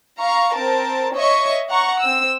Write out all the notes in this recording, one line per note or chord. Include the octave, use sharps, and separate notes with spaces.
F5 A#5 C#6
C4 A#4 A5
C#5 D#5 E5 C#6
F#5 A#5 C#6
C4 E6